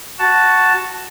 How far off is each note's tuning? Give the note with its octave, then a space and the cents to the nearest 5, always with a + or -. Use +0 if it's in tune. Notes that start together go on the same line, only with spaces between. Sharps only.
F#4 +0 A5 +0